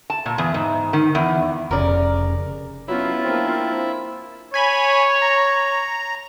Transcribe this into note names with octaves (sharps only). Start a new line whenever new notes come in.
A5
A#2
E2
G#2
D#3
E2
F1 C#3 A#4 D5
F#3 B3 C#4 E4 F4
A#3 C4 D4
C#5 G#5 B5 G#6
A#5